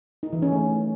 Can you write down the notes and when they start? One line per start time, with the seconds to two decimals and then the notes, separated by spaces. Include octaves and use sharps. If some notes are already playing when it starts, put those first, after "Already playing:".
0.23 D#4
0.33 E3
0.42 C#4
0.52 A3